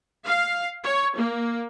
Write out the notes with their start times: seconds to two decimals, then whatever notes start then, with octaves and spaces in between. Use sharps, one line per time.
0.25 F5
0.84 C#5
1.17 A#3